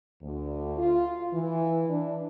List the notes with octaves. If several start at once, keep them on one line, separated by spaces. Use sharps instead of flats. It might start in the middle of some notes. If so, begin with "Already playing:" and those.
D2
F4
E3
D4